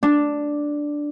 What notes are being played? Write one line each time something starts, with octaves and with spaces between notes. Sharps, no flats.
D4